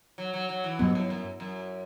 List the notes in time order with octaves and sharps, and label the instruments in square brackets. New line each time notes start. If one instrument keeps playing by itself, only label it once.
[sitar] F#3
F#3
F#3
E3
[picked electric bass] G2 F#3 B3 [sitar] B2
[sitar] A2
F#2
F#2